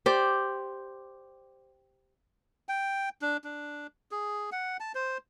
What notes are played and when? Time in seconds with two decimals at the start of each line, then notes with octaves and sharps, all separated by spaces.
0.06 G4 C5 D5
2.69 G5
3.22 D4
3.44 D4
4.11 G#4
4.52 F#5
4.80 A5
4.95 C5